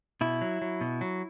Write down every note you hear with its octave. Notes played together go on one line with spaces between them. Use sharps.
B2 E4
F#3
F#3
B2
F#3